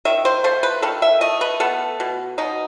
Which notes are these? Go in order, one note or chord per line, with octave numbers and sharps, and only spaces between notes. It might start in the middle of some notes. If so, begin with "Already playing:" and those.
D#3 E5
C5
A3 C5
B4
D#3 A4
E5
A3 D#5
B4
B3 A4
B2
B2 D#4